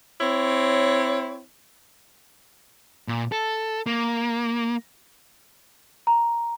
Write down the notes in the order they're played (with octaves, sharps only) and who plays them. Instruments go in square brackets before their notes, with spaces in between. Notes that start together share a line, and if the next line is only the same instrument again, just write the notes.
[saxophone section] C4 E4 C#5
[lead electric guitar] A#2
A4
A#3
[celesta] A#5